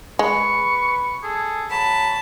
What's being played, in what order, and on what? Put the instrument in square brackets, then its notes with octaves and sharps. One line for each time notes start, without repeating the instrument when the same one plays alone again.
[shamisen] G#3 [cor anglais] B4 [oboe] C#6
[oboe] C#6
[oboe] G#4 [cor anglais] A4
[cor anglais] F#3 [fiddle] A5 [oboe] B5